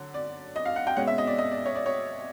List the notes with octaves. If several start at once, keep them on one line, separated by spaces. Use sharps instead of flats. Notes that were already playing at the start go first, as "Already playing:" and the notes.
Already playing: D3 F#3
D5
D#5
F5
F#5
G5
B2 G#3 C#4 F#5
E5
D#5
D5
D#5
D5
C#5
D5
C#5